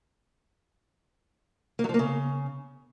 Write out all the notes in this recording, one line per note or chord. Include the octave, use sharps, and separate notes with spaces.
A#3
F#3
F3
A#3
C#3